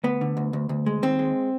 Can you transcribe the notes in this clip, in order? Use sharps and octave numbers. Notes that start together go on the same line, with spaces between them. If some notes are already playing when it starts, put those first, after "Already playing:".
D2 B3
D3
D2
D2
D2
G#3
D#2 C4
G#3